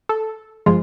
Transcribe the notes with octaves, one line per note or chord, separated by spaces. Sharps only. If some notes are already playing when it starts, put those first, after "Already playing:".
A4
G1 F3 G#3 F4